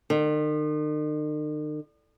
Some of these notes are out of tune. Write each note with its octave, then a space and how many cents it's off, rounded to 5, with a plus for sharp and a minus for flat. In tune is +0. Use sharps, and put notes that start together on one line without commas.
D#3 -45